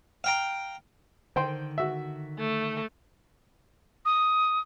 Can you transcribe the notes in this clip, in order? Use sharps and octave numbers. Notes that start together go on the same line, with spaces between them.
F5 G5 A#5
D3 D#3 C5 G5 C6
F#4 E5
A3
D#6